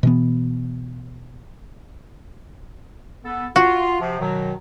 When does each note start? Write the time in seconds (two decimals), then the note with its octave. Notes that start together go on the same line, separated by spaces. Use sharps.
0.03 B2 E3 B3
3.25 B3 A4
3.56 F4 F#4
4.00 C3 F3
4.20 B2 D#3 F#3